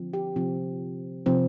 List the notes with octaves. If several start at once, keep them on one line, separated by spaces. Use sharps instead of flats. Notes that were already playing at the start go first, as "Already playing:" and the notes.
Already playing: D3 F3 C4
G4
C3 F3 C4
C3 F3 C4